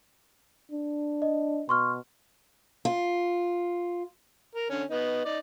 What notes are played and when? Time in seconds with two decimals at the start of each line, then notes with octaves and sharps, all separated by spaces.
0.71 D4
1.22 D#5
1.69 B2 C6 C#6 F6
2.85 F4
4.55 A#4
4.70 D3 C#4
4.91 B3 D#4
5.25 D#4 D5